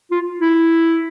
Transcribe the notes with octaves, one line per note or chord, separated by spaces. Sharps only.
F4
E4